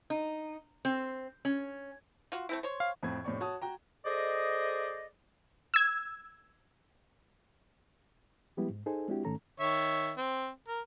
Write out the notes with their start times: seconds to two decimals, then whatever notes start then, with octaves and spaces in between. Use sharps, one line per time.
0.10 D#4
0.85 C4
1.45 C#4
2.32 F4 F#4
2.49 A3 C4 E4
2.63 C5 C#5
2.80 F5
3.03 F2 A2 C4 G#6
3.24 F1 A2 C4 C#5 D5 C#6
3.40 F#4 C#5 A5 D#6
3.62 F#4 G5 A#5
4.06 G#4 A4 C5 D5 D#5
5.74 E6 G#6
8.57 F3 G3 G#3 B3 E4 G4
8.70 G#2
8.86 D#4 G#4 A4 C5 G#5
9.08 G#3 C4 D4 E4 F#4 G4
9.25 G#2 D#3 A3 C#4 A4 A#5
9.60 D#3 C#5 E5
10.17 C4
10.68 A#4